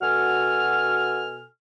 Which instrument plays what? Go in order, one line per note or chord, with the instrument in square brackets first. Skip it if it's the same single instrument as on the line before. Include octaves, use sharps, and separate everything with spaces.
[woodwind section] B2 F#4 A4 G#5 F6